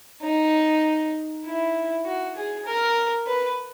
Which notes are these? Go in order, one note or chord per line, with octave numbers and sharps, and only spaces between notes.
D#4
E4
F#4
G#4
A#4
B4